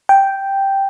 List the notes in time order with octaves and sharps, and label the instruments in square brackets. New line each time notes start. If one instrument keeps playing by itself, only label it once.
[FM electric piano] G5